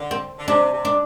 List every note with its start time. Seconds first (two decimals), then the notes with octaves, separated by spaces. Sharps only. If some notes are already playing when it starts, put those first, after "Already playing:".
Already playing: D3
0.11 C4
0.38 D3
0.47 C3 D4
0.73 C3
0.85 D4